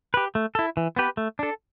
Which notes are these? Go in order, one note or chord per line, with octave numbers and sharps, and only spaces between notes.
G4 B4
A3
E4 A4
E3
B3 G4 B4
A3
D4 A4